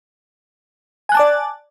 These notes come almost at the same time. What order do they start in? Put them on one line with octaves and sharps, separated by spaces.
G#5 F#6 A5 D6 D5